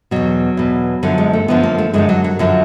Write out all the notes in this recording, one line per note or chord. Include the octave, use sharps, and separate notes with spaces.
E2 B2 F#3
E2 B2
F#2 D3 F3 F#3
G#3
A3
F#2 D3 F3 B3
A#3
A3
F#2 D3 F3 G#3
F#3
F#3
F#2 D3 F3 F#3